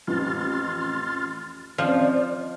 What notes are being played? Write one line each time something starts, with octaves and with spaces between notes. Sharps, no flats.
A1 F2 C6 F6 A6
F3 C4 C#4 C5 D5 D#5 F6 C7